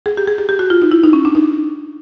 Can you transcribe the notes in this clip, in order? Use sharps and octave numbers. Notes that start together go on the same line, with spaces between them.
G#4
G4
G#4
G4
G4
F#4
F4
D#4
E4
D#4
C#4
D4
D#4